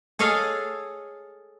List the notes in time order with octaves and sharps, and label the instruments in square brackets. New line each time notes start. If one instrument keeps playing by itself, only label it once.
[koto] G#4 A4 C#5 D#5 F5